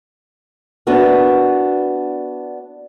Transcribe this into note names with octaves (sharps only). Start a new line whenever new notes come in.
B3 D4 E4 F#4 A#4